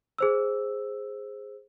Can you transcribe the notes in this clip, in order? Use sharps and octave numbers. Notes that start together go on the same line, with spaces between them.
G#4 C5 E6